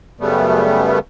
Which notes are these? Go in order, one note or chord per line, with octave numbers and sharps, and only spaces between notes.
F#2 C#3 G3 A3 B3